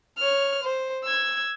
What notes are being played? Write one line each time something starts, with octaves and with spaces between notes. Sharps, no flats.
C#5 F6
C5
E6 G#6